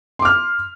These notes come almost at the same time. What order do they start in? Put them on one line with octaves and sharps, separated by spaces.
C6 D6 F6